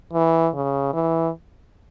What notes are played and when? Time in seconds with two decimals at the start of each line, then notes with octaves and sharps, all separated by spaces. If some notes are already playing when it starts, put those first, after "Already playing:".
0.13 E3
0.54 C#3
0.93 E3